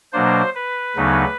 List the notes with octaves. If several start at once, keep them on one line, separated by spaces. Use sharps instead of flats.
B2 F#3 A#3 D4 C5
B4
D2 C#3 F#3 B3 D#4